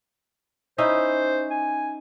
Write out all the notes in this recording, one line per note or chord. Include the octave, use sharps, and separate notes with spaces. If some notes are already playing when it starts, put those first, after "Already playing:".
C#4 D#4 E4 C5
G#5